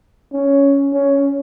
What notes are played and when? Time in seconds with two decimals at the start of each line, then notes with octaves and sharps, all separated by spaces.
0.33 C#4
0.93 C#4